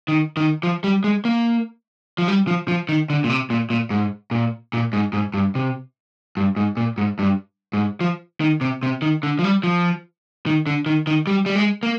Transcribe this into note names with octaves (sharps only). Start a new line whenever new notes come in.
D#3
D#3
F3
G3
G#3
A#3
F3
G3
F3
F3
D#3
D3
A#2
C3
A#2
A#2
G#2
A#2
A#2
G#2
G#2
G2
C3
G2
G#2
A#2
G#2
G2
G#2
F3
D#3
C3
C3
D#3
D3
F3
G3
F3
D#3
D3
D#3
D#3
G3
G3
G#3
A#3